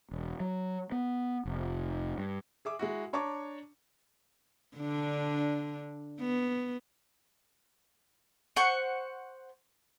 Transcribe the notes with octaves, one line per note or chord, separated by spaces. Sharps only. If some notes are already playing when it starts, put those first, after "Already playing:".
E1
F#3
B3
F1
G2
G#4 E5 D6
G#3 E4 F#4
D4 C#5 A5 A#5 C#6 D6
D3 D4
B3
C5 F#5 C#6